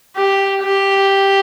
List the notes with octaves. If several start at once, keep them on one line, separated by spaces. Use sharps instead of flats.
G4
G4